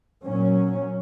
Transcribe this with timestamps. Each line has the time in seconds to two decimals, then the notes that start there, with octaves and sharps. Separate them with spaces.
0.24 A#2 F#3 C#4